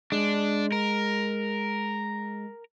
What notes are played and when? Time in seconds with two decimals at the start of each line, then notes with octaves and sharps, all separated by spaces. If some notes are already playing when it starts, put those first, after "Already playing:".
0.12 G#3 D4
0.72 A#4